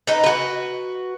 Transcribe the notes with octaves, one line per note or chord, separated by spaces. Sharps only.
D#4 B4
F#4 B4